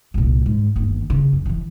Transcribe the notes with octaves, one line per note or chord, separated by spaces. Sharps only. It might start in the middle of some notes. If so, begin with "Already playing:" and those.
C2 A#2
G#2
G1 D#2
C#3
F#2
D3 E3